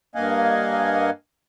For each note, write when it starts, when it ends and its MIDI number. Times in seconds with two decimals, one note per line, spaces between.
0.15 1.10 43
0.15 1.10 58
0.15 1.10 75
0.15 1.10 77
0.15 1.10 78
0.15 1.10 80